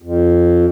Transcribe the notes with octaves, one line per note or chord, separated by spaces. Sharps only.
F2